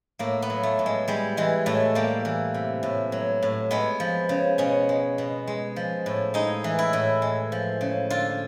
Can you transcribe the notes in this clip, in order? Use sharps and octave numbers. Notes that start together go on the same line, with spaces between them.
A2 A#3
B3
F#3
A3
A2
G#3
G3 G#3
E3 G#3
A2 A3
G3 A#3
E3
C3
A2
F#3
A2
G#3 B3
F3
C#3
B2 C#4
G#3
B2
G#3
F3
A2
G#3 D#4
E3
E4
A2
G#3
F3
C#3
D3 F4